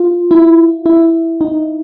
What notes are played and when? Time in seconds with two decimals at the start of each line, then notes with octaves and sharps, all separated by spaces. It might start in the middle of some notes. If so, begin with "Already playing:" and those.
Already playing: F4
0.31 E4
0.86 E4
1.41 D#4